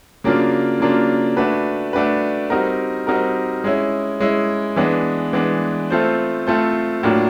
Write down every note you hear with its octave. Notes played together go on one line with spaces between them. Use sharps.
C#3 F#3 A#3 D4 F4
C#3 F#3 A#3 D4 F4
A3 D4 F#4 B4
A3 D4 F#4 B4
G3 C4 D#4 F#4 A#4
G3 C4 D#4 F#4 A#4
G#3 C#4 E4
G#3 C#4 E4
E3 G#3 B3 D4
E3 G#3 B3 D4
A3 C4 F4 A4 C5
A3 C4 F4 A4 C5
A2 F#3 A#3 D4 F4